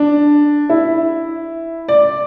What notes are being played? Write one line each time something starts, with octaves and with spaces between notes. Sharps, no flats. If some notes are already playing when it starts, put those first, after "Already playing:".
Already playing: D4
E4
D5